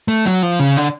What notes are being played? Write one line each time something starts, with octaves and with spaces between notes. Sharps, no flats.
A3
F#3
F3
C#3
D3